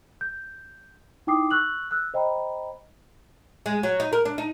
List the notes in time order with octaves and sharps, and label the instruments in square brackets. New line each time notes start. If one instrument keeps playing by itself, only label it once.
[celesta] G6
D#4 E4 G5 D6 D#6 C7
C#6 E6 F#6 F#7
E6 F#6
C5 D#5 G5 A#5 B5
[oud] G#3
F#3
D#4
A#4
D4
D#4